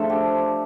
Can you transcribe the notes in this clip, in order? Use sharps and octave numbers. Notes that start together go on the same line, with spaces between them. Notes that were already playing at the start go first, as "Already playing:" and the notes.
Already playing: F3 A3 D4 A4
G4